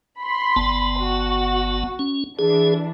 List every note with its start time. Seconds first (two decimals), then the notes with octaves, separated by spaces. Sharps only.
0.20 B5 C6
0.56 G1 B3 A5
0.99 F#4
1.99 C#4
2.39 E3 D4 G#4